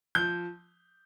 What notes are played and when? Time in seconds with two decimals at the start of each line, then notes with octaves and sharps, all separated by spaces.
0.15 F3 G6